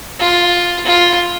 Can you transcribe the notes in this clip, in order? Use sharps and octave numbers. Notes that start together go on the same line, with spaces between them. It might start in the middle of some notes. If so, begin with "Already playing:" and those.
F4
F4